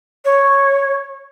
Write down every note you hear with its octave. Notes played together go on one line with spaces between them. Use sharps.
C#5